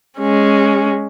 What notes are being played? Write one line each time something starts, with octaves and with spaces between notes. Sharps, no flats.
G#3 C#4